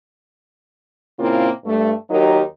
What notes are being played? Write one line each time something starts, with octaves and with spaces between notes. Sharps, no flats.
A#2 C#3 A#3 C4 E4 F4
G2 A3
D#2 F#3 D#4 G4 A#4